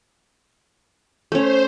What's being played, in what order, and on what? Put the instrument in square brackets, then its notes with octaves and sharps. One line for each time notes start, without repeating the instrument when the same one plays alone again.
[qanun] A3 C#4 [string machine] C5